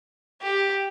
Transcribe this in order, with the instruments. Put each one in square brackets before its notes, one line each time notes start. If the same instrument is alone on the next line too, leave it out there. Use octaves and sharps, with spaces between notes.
[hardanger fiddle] G4